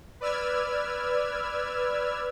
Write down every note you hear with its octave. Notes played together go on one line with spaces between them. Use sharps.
B4 D5 E6 F6 G#6